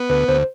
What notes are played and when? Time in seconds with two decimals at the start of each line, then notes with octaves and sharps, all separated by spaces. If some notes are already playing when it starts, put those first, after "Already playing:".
Already playing: B3
0.09 D2 B4
0.28 D2 C5